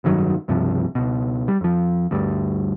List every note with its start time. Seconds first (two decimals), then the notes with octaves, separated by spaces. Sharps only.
0.04 F1 G2 D#3 F#3
0.48 C#2 G2 C3 F3
0.95 C#2 B2
1.48 G3
1.61 F2 F3
2.11 D2 G2 G3